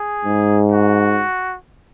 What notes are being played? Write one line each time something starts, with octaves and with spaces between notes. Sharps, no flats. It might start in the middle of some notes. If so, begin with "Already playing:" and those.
Already playing: G#4
G#2
F#4